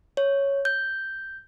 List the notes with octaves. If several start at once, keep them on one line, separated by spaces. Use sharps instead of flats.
C#5
G6